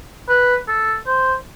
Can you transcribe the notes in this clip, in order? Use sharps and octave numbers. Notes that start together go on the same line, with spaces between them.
B4
A4
C5